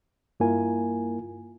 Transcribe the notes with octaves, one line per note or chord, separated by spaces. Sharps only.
G2 A#3 E4 F4 A#4 G#5